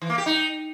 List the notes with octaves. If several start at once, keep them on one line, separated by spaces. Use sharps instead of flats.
E3
A#3
G4
D#4